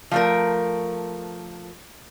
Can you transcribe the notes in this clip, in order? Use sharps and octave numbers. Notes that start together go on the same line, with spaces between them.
F3 A3 A#4